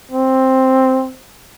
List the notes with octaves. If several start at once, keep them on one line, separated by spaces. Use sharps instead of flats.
C4